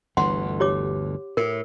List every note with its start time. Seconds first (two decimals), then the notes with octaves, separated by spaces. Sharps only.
0.17 G1 D2 E3 F#5 C6
0.60 G4 C#5 D6
1.37 A2 A#4